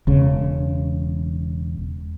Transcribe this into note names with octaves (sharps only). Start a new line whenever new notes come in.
E1 C#3